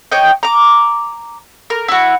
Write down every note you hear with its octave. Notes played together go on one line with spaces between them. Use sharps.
C#5 D#5 G5
A#5 D6
A#4
E4 F#4